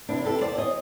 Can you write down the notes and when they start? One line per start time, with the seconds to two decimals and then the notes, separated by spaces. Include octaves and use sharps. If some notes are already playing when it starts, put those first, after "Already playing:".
0.09 C3 E3 D4 E4
0.25 G4 A4
0.41 E2 C5 D5
0.58 C#5 D#5